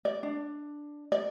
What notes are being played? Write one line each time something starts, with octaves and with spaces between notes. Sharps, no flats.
D5
D4
D5